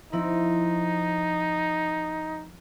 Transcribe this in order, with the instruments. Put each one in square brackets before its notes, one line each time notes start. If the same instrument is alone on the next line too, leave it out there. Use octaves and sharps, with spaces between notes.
[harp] F3 C4 E4 [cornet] D#4